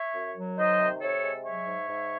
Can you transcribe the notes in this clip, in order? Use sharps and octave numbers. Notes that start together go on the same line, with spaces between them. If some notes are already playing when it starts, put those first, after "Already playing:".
Already playing: C#5 E5
F#2
F#3
D#3 C5 D#5
C3
C3 A4 C#5
G#3
F#3 C#5 E5
G#2
G#2